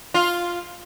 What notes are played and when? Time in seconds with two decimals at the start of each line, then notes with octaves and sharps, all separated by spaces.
0.14 F4